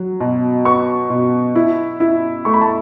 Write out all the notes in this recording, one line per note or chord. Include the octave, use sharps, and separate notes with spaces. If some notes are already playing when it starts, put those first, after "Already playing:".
Already playing: F#3
B2
B3 C#6
B2
E4
E4
A3 C#6
B5
A5